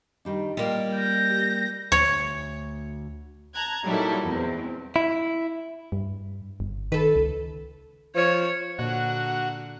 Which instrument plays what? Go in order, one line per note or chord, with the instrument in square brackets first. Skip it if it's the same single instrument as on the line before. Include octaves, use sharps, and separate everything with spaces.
[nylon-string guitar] D#3 G3 D4
[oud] G3 A#3 [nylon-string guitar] F4 D#5
[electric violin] G6 A#6
[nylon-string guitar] G4
[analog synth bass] D2 [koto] C#5
[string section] A5 A#5 F#6 G#6
A#2 F#3 G3 D#4 E4 A4
E2 C4
[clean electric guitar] E4
[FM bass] G2
G1
[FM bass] D#3 [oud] A4 B4
[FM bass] C#2
[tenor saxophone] F3 [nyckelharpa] C#5
[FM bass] A#2 [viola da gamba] D3 A#3 D4 [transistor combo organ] F#4 [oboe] F#5